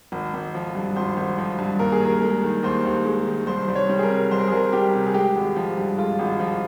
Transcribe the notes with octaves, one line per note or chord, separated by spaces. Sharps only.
G#1
G#1
F3
G2
G#1 C5
G#1
F3
G2
D#2 A#4
G#4
D#2 A#4
G#3
D#3
D#2 C5
D#2
G#3
D#3
C2 C5
C2
C#5
G3
G#4
A#4
C3
C2 C5
A#4
G#4
C2 A#4
G3 G4
C3
G#4
G#3 G4
G#1
F3
G2
G#3 F4
G#1
F3